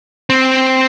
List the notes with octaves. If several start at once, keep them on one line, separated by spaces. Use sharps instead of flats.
C4